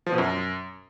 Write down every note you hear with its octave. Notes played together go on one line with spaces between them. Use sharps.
F3
B2
F#2